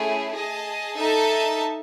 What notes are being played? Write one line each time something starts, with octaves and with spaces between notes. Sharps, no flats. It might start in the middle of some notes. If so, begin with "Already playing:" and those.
Already playing: A3 C#4 E4 G#4
G#4 D#5 A5
D#4 A4 E5 A5